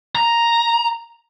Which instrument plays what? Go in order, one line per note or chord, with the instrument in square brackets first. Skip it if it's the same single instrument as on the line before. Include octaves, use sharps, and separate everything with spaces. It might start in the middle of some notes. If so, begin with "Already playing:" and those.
[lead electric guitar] A#5